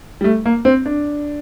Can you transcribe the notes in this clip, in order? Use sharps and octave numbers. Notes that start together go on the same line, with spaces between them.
G3
A3
A#3
C4
D4